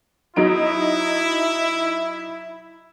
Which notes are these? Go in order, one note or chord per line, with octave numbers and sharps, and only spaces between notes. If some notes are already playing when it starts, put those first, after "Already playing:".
F#3 D#4 E4 D7